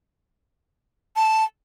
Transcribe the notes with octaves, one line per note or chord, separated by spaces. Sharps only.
A5